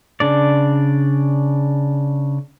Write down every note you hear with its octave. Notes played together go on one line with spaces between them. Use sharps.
C#3 D4 D5